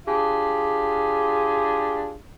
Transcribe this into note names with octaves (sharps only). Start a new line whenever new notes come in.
D4 F4 G4 G#4